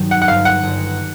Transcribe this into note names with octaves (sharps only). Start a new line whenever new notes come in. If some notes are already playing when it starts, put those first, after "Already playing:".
Already playing: G2 D#3 F#3
F#5
F#5
G1 F5
F#5
G1